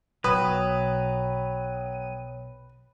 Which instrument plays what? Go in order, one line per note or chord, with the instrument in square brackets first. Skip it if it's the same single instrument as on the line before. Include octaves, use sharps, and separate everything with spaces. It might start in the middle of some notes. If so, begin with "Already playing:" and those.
[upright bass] B1 B2 [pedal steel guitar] F#3 D#6 [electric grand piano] B4 [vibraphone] C#5 G5